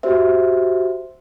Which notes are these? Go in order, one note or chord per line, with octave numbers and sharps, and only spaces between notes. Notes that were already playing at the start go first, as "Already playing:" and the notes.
F#4 G4 C5 E5